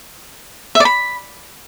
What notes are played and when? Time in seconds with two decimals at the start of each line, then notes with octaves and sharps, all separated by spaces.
0.75 E5
0.80 D5
0.85 B5